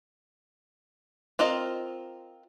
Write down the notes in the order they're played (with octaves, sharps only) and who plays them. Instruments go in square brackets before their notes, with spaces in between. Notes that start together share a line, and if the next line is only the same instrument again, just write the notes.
[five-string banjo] C4 F4 A#4 D#5